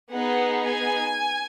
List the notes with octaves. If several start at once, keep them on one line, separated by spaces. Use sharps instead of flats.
B3 D#4 G#4 F#5
G#5